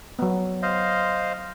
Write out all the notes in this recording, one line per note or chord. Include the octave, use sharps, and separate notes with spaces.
F#3 B3
C5 D#5 F5